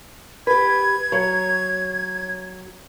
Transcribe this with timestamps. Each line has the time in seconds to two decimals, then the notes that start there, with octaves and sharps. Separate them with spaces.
0.47 G4 B4 G#6
1.12 F#3 C#5